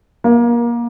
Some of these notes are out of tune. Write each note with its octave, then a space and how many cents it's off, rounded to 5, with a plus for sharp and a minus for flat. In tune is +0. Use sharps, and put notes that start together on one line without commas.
A#3 +25